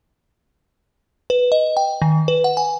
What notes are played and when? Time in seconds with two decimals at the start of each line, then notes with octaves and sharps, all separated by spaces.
1.30 B4
1.52 D#5
1.77 G5
2.02 D#3
2.28 B4
2.44 F#5
2.57 G#5